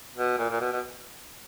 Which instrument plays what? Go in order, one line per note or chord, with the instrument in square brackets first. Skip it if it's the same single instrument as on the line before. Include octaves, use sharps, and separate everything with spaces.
[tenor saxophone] B2
A#2
A#2
B2
B2